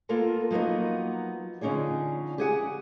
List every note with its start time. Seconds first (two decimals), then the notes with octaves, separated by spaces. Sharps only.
0.09 A#3 B3 F4 A4 A#4 A5
0.51 F3 F#3 A#3 B3 D#4
1.61 D3 F3 C#4 D#4 G#4 D5
2.38 G4 G#4 F#5 G#5